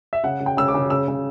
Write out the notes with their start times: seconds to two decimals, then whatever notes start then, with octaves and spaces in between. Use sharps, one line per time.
0.13 E5
0.24 C#3 F#5
0.40 C#3
0.46 G5
0.57 C#3 E6
0.68 D6
0.74 C#3
0.90 C#3 E6
1.08 C#3